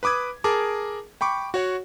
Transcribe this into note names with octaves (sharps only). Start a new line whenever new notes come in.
B4 B5 D6 D#6 G#6
G#4 A#4 A5 D6
G5 B5 C#6 D6
F#4 C#5 F#5